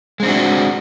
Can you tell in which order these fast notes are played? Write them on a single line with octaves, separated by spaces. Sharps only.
G#3 C4 D4 F#4